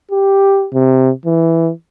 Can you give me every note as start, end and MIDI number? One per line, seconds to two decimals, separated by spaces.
0.11 0.67 67
0.74 1.11 48
1.26 1.71 52